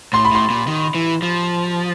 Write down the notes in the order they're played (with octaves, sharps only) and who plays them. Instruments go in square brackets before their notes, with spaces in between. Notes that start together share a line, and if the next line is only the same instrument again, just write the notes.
[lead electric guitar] A2 [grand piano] C6
[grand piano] B5
[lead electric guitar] A2 [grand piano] C6
[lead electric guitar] A#2
D#3
E3
F3